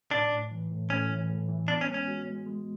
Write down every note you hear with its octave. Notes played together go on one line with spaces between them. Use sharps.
A2 D4
A2
E3
A2
A2 C#4
E3
A2
E3
B3 D4
C#4
G#3
C#4
F#4
G#3
G#3